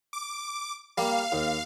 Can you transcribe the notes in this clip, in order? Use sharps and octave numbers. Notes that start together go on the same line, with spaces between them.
D6
G3 A#3 F5
D#2